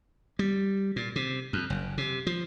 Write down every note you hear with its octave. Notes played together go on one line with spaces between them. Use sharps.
G3
A#2
C3
F2
F#1
C3
F3